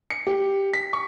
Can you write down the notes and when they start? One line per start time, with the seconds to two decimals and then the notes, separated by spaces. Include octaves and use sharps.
0.10 C#7
0.27 G4
0.73 B6
0.93 C#6